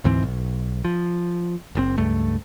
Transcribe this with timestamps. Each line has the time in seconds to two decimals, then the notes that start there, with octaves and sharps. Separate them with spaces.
0.04 D2 G#2 E3 C4
0.23 B1
0.85 F3
1.75 F#1 A2 C4
1.98 C#2 G2 A3